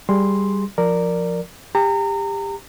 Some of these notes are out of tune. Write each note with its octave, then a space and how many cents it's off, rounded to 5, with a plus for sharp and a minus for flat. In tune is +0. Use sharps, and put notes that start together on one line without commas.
G3 +0 G#4 +0 C6 +0
F3 +0 A#4 -10 D5 +0
G4 +25 A#5 -30